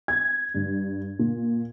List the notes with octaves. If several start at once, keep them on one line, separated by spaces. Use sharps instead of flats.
G#6
G2
A#2